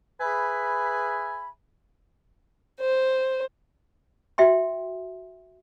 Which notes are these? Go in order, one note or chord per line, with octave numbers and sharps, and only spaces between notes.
G#4 B4 E5 G#5 B5
C5
F#4 E5 G5 C6